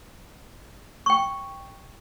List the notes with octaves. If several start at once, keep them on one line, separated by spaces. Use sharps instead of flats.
G5 C#6